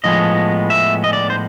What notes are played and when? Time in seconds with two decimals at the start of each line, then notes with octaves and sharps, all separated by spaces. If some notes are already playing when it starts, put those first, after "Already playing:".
0.04 A2 F3 G#3 B3 D#5
0.70 E5
1.04 D#5
1.13 D5
1.30 C5